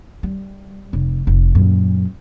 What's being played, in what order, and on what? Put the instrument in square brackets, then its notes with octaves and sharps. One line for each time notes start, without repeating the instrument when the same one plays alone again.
[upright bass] G3
F1
F1
F#2 A#2